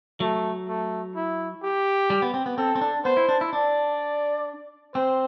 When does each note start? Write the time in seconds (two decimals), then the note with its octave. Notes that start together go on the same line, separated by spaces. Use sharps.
0.20 F#3 A3
0.69 A3
1.15 E4
1.63 G4
2.10 G3
2.22 B3
2.34 C4
2.46 B3
2.58 C4 A4
2.76 C4
2.81 D4
3.05 B3 C5
3.17 E4
3.29 D4
3.41 E4
3.53 D4 D5
4.94 C4 C5